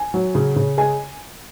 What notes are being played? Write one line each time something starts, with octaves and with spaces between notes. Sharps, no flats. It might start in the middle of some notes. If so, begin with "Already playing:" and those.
Already playing: G#5
F#3
C#3
C#3
G#3 G#5